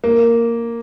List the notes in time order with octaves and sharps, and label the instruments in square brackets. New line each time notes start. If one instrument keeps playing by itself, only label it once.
[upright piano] A#3